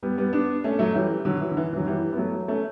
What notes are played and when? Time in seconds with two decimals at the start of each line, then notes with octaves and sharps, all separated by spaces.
0.03 G3 B3
0.18 G3 B3
0.33 B3 D4
0.64 A3 C#4
0.79 F#3 A3
0.94 E3 G3
1.25 D3 F#3
1.40 E3
1.51 D3
1.57 E3
1.73 E3
1.76 D3 F#3
1.86 E3 G3
2.13 B3
2.17 F#3 A3
2.48 A3 C#4